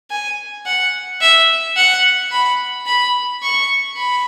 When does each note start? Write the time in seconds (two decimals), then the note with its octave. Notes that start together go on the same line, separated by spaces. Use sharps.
0.11 G#5
0.66 F#5
1.21 E5
1.77 F#5
2.32 B5
2.87 B5
3.43 C#6
3.97 B5